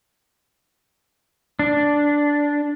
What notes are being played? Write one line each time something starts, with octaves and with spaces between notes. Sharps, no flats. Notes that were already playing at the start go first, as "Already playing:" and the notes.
D4